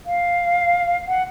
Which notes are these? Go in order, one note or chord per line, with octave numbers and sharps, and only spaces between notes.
F5
F#5